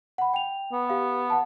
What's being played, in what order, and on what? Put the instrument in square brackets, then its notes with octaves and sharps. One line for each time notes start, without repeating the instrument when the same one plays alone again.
[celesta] F#5 B5
G5 F7
[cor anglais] B3
[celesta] G4 F5
F#5 A5